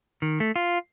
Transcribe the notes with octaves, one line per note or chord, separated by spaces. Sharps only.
D#3
A3
F4